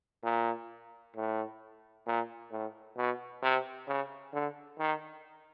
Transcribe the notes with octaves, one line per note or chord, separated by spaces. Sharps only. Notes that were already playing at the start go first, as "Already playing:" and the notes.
A#2
A2
A#2
A2
B2
C3
C#3
D3
D#3